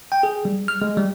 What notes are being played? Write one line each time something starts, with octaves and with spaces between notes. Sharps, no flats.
G5
G#4
G3
F6
G#3
G3